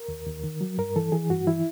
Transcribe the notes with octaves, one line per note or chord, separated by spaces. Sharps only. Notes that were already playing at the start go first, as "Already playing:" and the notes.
Already playing: A#4
D#2
D#2
D#3
F#3
G2 A#4
E3 A4
E3 G#4
G2 F#4
E3 E4